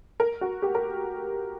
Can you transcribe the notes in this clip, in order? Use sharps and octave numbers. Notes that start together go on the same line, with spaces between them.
A#4
F#4
G4
A#4